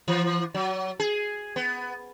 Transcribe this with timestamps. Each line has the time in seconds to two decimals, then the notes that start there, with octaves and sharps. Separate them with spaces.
0.08 E3
0.54 F#3
1.00 G#4
1.56 B3